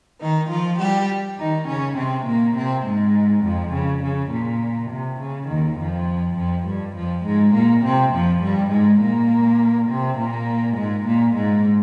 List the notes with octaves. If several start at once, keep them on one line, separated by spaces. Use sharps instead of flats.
D#3 D#4
F3 F4
G3 G4
D#3 D#4
C#3 C#4
C3 C4
A#2 A#3
C3 C4
G#2 G#3
F2 F3
C#3
C#3
A#2
C3
C#3
D#2 D#3
F2 F3
F2 F3
G2 G3
F2 F3
G#2 G#3
A#2 A#3
C3 C4
F2 F3
G2 G3
G#2 G#3
A#2 A#3
C3 C4
A#2 A#3
G#2 G#3
A#2 A#3
G#2 G#3